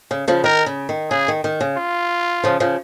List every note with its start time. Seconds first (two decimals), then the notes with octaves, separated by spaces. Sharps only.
0.11 C#3
0.28 C#3 F3
0.44 D#3 A#4
0.66 C#3
0.89 D#3
1.10 C#3 G#4
1.28 D#3
1.44 D#3
1.61 C#3
1.77 F4
2.44 C#3 F3
2.60 C#3 F3